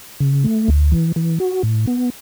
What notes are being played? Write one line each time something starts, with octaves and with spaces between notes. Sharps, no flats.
C#3
A3
D2
E3
E3
F#4
A2
B3